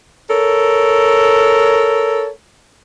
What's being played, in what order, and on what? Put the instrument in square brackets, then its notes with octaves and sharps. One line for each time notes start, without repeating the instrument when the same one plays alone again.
[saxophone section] A4 A#4 C#5